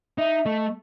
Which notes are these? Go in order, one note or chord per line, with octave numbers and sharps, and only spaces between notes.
D#4 E5
A3 D#5